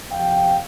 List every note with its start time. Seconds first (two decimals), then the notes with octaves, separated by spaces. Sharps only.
0.12 F2 C3 F3 F5 G5